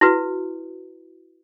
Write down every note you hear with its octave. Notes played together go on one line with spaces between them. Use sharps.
E4 F#4 B4